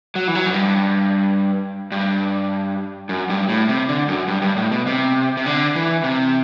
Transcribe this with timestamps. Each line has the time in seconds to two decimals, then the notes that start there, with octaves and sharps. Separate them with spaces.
0.15 F#3
0.28 E3
0.35 F#3
0.46 F#2
0.54 G2
1.92 G2
3.09 F#2
3.30 G2
3.49 A2
3.69 C3
3.89 D3
4.08 F#2
4.28 G2
4.42 G2
4.56 A2
4.71 B2
4.87 C3
5.37 C3
5.46 D3
5.75 E3
6.04 C3